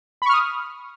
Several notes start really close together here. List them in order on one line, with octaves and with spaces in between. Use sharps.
B5 C#6 F6 D#6